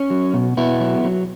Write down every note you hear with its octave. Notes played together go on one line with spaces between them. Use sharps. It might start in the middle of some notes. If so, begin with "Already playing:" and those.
Already playing: C#4
F#3
B2
B2 B3 E4
F#3
F#3